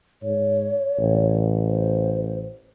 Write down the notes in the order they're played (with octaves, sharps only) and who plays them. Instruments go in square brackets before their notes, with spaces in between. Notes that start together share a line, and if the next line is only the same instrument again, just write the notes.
[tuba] G#2 [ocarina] C#5
[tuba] A1
[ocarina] C5